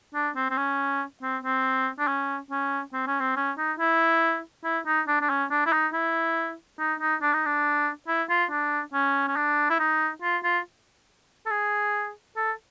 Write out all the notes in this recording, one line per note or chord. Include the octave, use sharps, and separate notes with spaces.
D4
C4
C4
C#4
C4
C4
D4
C#4
C#4
C4
C#4
C4
C#4
D#4
E4
E4
D#4
D4
D4
C#4
D4
E4
D#4
E4
D#4
D#4
D4
D#4
D4
E4
F4
D4
C#4
C#4
D4
E4
D#4
F4
F4
A4
G#4
A4